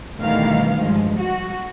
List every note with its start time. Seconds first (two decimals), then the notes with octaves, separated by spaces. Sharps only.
0.18 D2 B2 D#3 E3 G3 F5
0.78 G2 F3 G#3
1.18 F#4